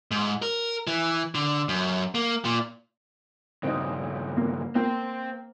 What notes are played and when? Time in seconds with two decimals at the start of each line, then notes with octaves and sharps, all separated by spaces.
0.11 G#2
0.42 A#4
0.87 E3
1.35 D3
1.69 F#2
2.15 A#3
2.45 A#2
3.63 G2 C#3 C4 D#4
4.37 A#3
4.75 A#3 C5 G5